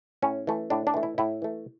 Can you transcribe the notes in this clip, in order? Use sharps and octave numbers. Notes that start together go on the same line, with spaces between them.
A2 C#4
E3 A3
A2 D4
D4
E3 A3
E4
A2 E4
E3 A3